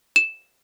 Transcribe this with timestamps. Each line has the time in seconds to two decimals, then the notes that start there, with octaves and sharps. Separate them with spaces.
0.16 E7